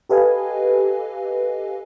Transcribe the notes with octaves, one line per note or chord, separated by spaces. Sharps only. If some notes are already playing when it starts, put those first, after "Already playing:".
G4 A4 B4 D#5 F5 G#5